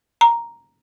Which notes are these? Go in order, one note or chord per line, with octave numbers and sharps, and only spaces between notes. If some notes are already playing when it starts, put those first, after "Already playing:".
A#5